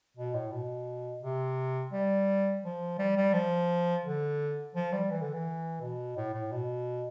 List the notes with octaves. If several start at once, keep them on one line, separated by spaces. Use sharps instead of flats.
B2
A2
B2
C3
G3
F3
G3
G3
F3
D3
F3
G3
E3
D3
E3
B2
A2
A2
B2